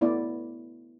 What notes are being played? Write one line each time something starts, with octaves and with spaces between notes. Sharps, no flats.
A3 B3 E4 D5